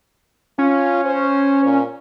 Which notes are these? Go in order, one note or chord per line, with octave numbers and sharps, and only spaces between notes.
C#4 F4
C5
A#2